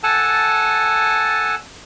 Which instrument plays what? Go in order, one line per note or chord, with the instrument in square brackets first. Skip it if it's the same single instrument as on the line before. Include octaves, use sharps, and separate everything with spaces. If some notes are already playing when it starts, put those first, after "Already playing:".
[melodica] A4 F#5 G#5 A5